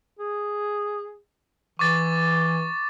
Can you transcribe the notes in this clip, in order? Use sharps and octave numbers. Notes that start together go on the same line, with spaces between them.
G#4
E3 C#6 D6 A6